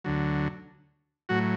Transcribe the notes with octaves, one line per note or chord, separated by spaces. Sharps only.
D2 D3 F#3
A2 F#3 F#4